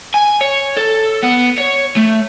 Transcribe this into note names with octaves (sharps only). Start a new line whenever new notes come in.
G#5
C#5
A4
B3
C#5
A3